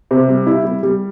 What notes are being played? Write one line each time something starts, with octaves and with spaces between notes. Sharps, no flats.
C3
G3
E4
G3
G3